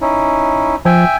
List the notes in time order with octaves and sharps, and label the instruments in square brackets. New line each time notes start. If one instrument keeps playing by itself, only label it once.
[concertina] C#4 D#4 E4
[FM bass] F3 [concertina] E5 G5 G#5